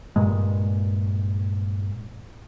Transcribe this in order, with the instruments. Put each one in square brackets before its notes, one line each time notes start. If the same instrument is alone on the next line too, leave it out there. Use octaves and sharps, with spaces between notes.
[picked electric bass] G2 A#2 G#3